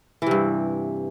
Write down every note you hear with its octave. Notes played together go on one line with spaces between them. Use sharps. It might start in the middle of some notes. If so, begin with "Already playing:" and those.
G2 C3 E3